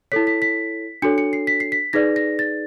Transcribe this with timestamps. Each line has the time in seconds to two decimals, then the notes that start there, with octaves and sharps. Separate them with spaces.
0.12 E4 A4 C#5 B6
0.27 B6
0.42 B6
1.02 D4 F#4 A4 C#5 C#7
1.18 C#7
1.33 C7
1.47 B6
1.60 C7
1.72 B6
1.93 D#4 G#4 B4 D5 A#6
2.16 A#6
2.39 A6